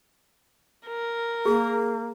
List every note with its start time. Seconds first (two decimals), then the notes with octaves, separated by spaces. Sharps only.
0.86 A#4
1.46 A#3 G#4